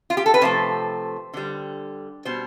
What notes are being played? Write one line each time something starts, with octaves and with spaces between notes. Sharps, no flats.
F4
G4
A4
B4
C3 F3 A3 C5
D3 G3
B2 G3 C5